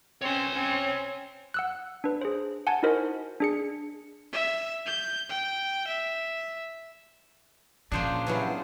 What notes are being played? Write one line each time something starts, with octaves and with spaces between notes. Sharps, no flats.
C4 C#4 C#5 C6
C4 C#4
F#5 E6 F#6
D4 B4
G#4 C5
F#5 G#5 A5 G#6
D#4 E4 F#4 A#4 C5 D#5
D4 G#4 C#7
E5
G6
G5
E5
A#2 C#3 F3 A#3 D4 C5
G2 C#3 E3 F#3 B3 F4